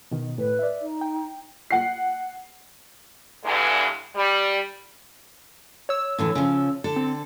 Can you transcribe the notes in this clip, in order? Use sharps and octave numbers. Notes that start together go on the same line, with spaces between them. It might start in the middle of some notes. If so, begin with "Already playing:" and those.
B2 D#3
A2 B4
D5 E5
D#4
G5
F#5 C7
E2 G2 D3 E3 G#3
G3
C#5 E6
A2 D3 E3
C#3 F3
D3 A4
C4